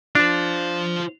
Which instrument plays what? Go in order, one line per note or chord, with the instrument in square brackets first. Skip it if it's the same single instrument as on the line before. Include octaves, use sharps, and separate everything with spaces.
[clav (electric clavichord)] D4 [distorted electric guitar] F4 C5